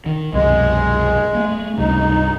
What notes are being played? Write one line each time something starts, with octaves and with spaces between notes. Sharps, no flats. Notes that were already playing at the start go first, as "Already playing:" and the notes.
D#3
C2 F#2 B2 G#3
A3 A#3
C#2 G2 C3 D#4